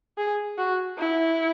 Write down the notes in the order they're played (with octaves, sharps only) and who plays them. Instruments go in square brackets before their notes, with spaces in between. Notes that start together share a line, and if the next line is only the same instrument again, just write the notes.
[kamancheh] G#4
F#4
E4